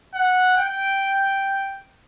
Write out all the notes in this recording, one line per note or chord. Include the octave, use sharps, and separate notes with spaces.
F#5
G5